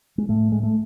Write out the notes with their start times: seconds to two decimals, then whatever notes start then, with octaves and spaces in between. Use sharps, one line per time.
0.18 G#3
0.29 A2 A3
0.52 G#3
0.63 A3